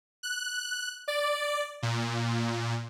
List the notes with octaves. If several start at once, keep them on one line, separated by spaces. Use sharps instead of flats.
F#6
D5
A#2